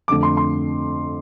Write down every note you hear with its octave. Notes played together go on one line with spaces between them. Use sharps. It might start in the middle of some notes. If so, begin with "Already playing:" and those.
F2 D3 A3 D6
C6
C6